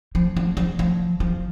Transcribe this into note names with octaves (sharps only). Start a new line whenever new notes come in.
F3
F3
F3
F3
F3